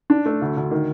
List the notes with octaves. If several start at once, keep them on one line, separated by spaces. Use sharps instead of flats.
D4
A3
D2
D2
D#3